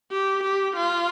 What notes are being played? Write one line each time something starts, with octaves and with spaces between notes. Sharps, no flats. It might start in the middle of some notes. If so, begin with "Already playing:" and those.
G4
G4
F4